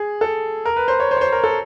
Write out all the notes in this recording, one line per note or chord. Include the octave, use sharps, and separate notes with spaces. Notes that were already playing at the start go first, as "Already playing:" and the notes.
Already playing: G#4
A4
A#4
B4
C5
C#5
C5
C#5
C5
A#4
A4